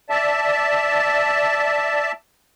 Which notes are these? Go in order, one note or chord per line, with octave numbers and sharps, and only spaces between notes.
D5 E5 A5